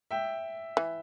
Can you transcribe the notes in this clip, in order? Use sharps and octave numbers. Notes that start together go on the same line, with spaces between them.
E5 G5
E3